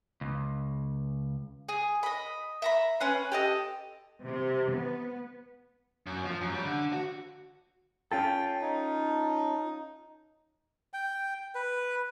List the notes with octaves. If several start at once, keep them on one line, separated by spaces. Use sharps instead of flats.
C#2
G#4
D#5 B5
E5 A#5 B5
C#4 B4 F#5 C6
G4 A4 D#5
C3
B3
F#2
F3
F#2
G3
D3
F#4
C#4 F4 A4 G5
D#4
G5
B4